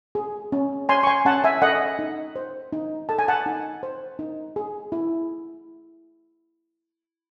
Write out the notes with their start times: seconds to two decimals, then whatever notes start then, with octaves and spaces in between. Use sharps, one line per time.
0.15 G#4
0.52 C#4
0.89 C#5 G#5 C6
1.03 C#6
1.07 G#5 C6
1.25 C#4 F#5 A5
1.44 E5 G#5
1.62 A4 D#5 F#5
1.99 D#4
2.36 C5
2.73 D#4
3.09 A4 A5
3.19 G#5
3.28 F#5 A5
3.46 D#4
3.83 C5
4.19 D#4
4.56 G#4
4.92 E4